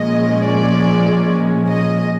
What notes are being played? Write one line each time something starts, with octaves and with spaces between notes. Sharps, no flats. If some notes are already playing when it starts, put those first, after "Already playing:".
Already playing: A#2 F3 G#3 C#4 D#5
D5
D#5